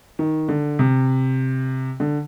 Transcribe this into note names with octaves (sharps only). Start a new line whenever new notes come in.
D#3
D3
C3
D3